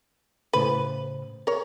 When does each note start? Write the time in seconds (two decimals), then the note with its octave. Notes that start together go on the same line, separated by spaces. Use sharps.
0.53 A2 C#3 B4 C5
1.47 A#4 C#5